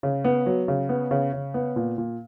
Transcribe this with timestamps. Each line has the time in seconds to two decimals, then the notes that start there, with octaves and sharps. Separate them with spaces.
0.03 C#3
0.24 B3
0.46 F#3
0.68 C#3
0.89 B3
1.11 C#3
1.33 C#3
1.54 B3
1.76 A#2
1.98 A#2